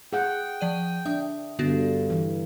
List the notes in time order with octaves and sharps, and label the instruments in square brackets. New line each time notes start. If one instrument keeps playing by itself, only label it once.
[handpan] G#4 F#5 [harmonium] G5
[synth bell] F3 D5 D#7
[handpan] D4 [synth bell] E5 D#6
[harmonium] G2 [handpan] D3 [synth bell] B3 D4 F#4
[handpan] E3